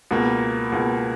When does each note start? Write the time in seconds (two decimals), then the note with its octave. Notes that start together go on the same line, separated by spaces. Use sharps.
0.11 C#2 B2 A#3
0.72 C#2 B2 A#3